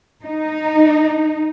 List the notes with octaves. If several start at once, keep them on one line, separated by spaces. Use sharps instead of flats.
D#4